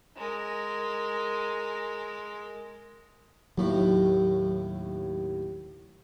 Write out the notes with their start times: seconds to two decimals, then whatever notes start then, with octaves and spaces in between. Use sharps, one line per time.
0.17 G#3 A#4
3.58 D#2 A2 F#3